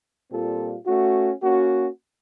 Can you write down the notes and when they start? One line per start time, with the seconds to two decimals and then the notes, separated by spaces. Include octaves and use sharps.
0.30 A#2 G3 C4 F4 A4
0.86 A3 C#4 F#4
1.42 A#3 C#4 F#4